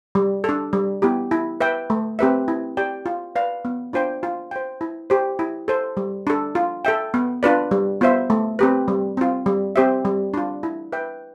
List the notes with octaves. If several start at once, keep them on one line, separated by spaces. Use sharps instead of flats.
G3
D4 A4
G3
B3 E4 G4
E4
B4 E5 G5
A3
C4 G4 B4 E5
E4
G4 D5 G5
F4
B4 D5 F5
B3
D4 F4 C5 G5
F4
C5 G5
E4
G4 C5
E4
A4 C5
G3
D4 A4
F4
A4 E5 G5
B3
D4 F4 B4 D5
G3
B3 F4 C5 E5
A3
C4 G4 B4
G3
C4 F4
G3
C4 G4 C5 E5
G3
D4 F4
E4
B4 E5 G5